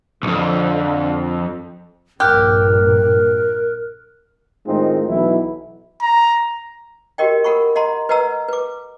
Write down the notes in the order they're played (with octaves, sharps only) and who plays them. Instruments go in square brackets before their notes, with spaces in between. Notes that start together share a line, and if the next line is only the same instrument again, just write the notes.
[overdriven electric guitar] B1 F2 [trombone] D3
[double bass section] A#1 G2 [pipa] G4 [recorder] A#4 [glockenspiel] F6 F#6
[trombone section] A2 D#3 G#3 C4 D#4 F4
B1 B2 E3 E4
[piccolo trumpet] A#5
[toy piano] F#4 G4 A#4 D#5 G5
A4 A#4 F#5 B5 C#6
D#5 F#5 A#5 C6
B4 D#5 F#5 A#5 E6
B4 D6